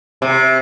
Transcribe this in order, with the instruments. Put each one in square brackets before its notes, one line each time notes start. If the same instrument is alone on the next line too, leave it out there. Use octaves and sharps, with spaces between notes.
[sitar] C3